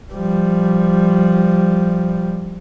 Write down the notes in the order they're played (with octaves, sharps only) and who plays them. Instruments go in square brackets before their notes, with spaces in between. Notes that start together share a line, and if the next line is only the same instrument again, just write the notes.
[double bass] F3 G3